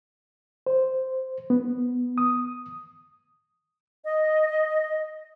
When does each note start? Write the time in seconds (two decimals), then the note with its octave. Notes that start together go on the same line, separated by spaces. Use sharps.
0.67 C5
1.50 B3
2.18 D#6
4.05 D#5